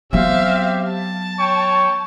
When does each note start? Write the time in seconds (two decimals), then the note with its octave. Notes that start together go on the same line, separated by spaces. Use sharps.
0.13 F#3 B3 C4 G4 E5 F5
0.89 A5
1.40 C#5 G5 C#6